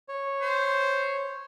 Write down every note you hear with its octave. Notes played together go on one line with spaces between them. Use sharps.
C#5
C5